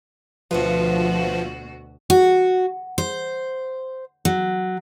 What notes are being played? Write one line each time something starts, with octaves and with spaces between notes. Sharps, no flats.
D2 B2 F3 F#4 B4 E5 F#5
F#4
C5
F#3